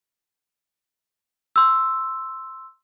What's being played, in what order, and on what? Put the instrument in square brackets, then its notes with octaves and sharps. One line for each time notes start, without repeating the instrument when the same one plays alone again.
[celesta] C6 E6